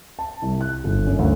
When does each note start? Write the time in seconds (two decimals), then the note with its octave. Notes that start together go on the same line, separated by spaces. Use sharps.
0.19 A5
0.42 C2
0.61 F#6
0.84 G1
1.07 F#2
1.19 D2